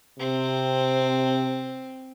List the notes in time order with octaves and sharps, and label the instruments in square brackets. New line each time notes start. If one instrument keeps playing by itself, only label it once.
[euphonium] C3 [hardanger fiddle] C4